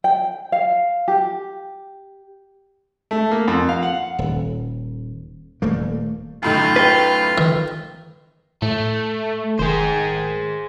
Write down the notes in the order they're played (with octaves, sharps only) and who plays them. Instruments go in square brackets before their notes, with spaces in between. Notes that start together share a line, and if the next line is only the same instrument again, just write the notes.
[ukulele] G5
F5
G4
[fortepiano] A3
A#3
F2
F5
F#5
[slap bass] D#1
D#1 A3 A#3
[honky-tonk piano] F#2 A2 D#3 [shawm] F4
[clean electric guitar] B4 G5
[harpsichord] D#3
[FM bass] A2 [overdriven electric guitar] A3
[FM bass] F1 [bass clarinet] D#3 [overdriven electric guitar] G#4 C5